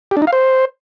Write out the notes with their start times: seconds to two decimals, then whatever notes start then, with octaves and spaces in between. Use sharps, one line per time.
0.11 G4
0.17 D4
0.22 D#4
0.27 F5
0.33 C5